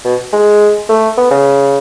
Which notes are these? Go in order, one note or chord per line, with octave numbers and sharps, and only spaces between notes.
B2
G#3
A3
B3
C#3